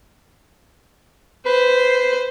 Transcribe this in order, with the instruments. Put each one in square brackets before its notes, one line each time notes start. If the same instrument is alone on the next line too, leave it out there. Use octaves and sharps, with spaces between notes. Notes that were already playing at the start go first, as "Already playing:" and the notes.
[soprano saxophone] B4 [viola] C5